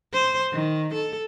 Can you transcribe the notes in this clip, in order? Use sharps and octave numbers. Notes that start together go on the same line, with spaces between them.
C5
D#3
A4